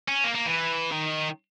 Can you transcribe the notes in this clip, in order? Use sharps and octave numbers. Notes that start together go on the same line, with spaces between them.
C#4
A#3
A#3
E3
D#3